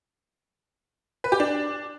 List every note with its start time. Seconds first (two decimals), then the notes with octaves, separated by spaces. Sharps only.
1.24 B4
1.32 G4
1.40 D4